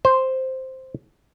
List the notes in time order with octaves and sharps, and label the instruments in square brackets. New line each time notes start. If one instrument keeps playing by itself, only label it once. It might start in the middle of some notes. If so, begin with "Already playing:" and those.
[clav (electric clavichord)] C5